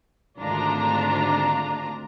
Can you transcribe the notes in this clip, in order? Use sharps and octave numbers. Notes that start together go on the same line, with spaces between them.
G#1 D2 D4 F4 A#5